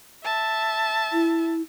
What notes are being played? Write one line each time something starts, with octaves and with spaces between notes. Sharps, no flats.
E5 A5
E4